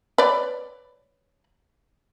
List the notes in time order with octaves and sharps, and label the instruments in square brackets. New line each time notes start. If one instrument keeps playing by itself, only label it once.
[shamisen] B4 C#5 D5